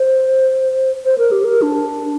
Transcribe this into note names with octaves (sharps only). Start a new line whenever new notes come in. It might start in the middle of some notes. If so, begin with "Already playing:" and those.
Already playing: C5
C5
A#4
G4
A#4
D4